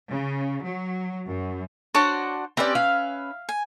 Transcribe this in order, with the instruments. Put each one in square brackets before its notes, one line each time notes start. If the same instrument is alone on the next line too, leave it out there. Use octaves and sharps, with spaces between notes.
[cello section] C#3
F#3
F#2
[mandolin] D4 F#4 C5 [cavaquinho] C#5 A5
[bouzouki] C4 G4 D5 [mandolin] C#4 B4 [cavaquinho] E5
[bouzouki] F5
[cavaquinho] G#5